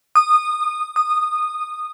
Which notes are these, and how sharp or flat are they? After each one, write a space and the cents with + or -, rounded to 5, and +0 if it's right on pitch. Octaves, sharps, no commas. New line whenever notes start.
D#6 -20
D#6 -15